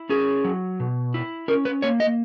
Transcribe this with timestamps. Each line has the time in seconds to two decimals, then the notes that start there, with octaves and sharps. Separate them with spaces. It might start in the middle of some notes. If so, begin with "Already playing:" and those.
Already playing: E4
0.09 C#4 G#4
0.45 F#3
0.80 B2
1.14 E4
1.48 C#4 A#4
1.65 B4
1.82 A#3 C#5
2.00 D#5